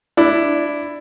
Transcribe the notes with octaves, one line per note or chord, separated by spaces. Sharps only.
D4 E4